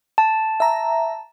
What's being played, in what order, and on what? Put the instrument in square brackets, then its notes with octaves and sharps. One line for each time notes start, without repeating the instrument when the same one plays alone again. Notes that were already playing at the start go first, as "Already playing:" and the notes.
[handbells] A5
[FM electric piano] E5 A#5